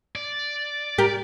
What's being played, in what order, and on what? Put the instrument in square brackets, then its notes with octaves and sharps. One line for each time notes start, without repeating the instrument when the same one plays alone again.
[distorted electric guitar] D5
[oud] G4 A#4